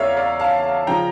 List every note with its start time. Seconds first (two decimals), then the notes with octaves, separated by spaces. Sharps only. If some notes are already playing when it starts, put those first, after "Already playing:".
Already playing: E2 C#3 A#4 C#5 D5 E5 F5
0.17 D5 F5
0.40 F5 A5
0.87 C#3 F3 G5 A#5